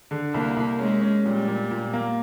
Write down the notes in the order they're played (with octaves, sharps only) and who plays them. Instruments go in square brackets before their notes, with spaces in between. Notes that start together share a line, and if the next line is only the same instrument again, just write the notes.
[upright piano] D3
[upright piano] C2 [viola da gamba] A#3
[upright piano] C2
[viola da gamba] G#3 [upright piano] C#4
[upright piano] C#4
[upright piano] A#2 [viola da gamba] G3
[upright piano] A#2
A#2
A#3